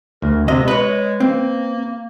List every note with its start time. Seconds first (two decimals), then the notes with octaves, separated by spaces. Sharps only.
0.22 D2 A#4
0.48 C3 G#3 D#5
0.68 B4 C#5 D#5
1.20 A#3 C4